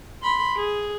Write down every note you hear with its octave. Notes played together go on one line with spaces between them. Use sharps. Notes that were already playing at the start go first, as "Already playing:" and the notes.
B5 C6
G#4